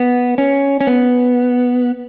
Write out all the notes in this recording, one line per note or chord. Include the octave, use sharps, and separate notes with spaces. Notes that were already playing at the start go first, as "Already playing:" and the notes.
Already playing: B3
C#4
C#4
B3